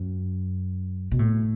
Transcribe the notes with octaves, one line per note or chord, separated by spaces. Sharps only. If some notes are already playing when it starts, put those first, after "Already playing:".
Already playing: F#2
B2
A2